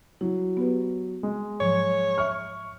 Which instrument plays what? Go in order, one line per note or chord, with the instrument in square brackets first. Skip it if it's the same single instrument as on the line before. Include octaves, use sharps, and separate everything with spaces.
[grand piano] F#3 [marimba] E4
[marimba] B3 G4 B4
[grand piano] G#3
[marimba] G#2 F3 F#3 [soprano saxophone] C#5
[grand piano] E5 C#6 F6